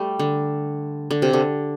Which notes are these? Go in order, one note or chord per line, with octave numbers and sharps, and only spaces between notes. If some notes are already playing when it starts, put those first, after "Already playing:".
Already playing: G3 A3
D3
D3
C3
D3